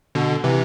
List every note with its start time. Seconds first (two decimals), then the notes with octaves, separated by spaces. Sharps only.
0.15 B2 D3
0.44 C3 E3